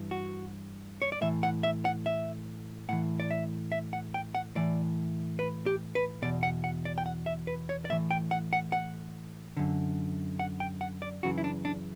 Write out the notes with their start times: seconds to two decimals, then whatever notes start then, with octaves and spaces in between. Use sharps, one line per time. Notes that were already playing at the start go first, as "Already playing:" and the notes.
Already playing: G2 E3
0.11 F#4
1.02 C#5
1.12 D5
1.21 A2 E3 E5
1.43 F#5
1.63 E5
1.85 F#5
2.06 E5
2.89 A2 E3 F#5
3.20 D5
3.31 E5
3.72 E5
3.93 F#5
4.14 G5
4.35 F#5
4.55 A2 E3 D5
5.39 B4
5.66 G4
5.95 B4
6.22 E2 B2 D5
6.43 F#5
6.64 F#5
6.85 D5
6.98 G5
7.06 F#5
7.26 E5
7.47 B4
7.69 C#5
7.85 D5
7.90 A2 E3 E5
8.11 G5
8.31 F#5
8.53 F#5
8.72 F#5
9.57 F#2 D3
10.39 F#5
10.60 G5
10.81 F#5
11.02 D5
11.23 F#2 C#3 E3 F#4
11.38 E4
11.44 D4
11.65 D4